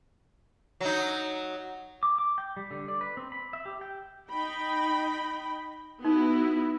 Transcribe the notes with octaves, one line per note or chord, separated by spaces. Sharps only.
F#3 D#4
D6
D6
G5
G3
D3
D5
B4
C4
B5
E5
G4
G5
D#4 G5 B5
B3 D#4 E4 F#4